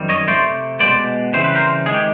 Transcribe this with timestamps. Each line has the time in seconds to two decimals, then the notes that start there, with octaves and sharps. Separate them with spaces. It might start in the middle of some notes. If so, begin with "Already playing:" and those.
Already playing: F#2 D#3 G3 C4
0.09 C#5 D#5
0.27 C3 F3 A3 C5 D5
0.80 B2 G#3 B3 C5 D5
1.33 C#3 E3 G3 C4 C5
1.44 B4
1.55 A#4 C5
1.86 C3 D#3 G#3 G#4
1.94 G4